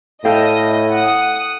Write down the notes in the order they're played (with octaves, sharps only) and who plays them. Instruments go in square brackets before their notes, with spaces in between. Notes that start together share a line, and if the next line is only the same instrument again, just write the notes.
[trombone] A2 [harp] A4 F5 G5 [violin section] D#5
[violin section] F#5 D#6